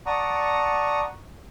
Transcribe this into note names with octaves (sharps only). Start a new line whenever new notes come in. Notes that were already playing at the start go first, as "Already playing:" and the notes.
D5 F#5 A5 A#5 C#6 D#6